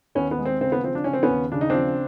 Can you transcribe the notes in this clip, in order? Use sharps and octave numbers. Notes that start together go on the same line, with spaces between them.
D#2 B3 C#4
B3
G#3
C4
C#3 C4
B3
F3 C4
D4
C#3 C#4
C4
B3 C#4
D#2
C#3 D4
D#4
F3 C4 D4